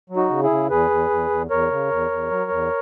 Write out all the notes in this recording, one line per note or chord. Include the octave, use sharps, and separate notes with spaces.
F#3
D#4 F#4
C#3
E4 G#4
C#3
E2 G#4 B4
E2
E2
E2
E2 A#4 C#5
C#3
E2
E2
F#3
E2